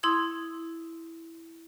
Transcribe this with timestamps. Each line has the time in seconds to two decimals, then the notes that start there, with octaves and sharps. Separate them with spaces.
0.03 E4 C6 D#6 G#6